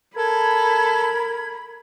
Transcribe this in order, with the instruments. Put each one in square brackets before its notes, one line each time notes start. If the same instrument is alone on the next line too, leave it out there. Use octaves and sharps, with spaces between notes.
[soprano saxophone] A4 [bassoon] A#4 [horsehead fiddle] B5 [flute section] G#6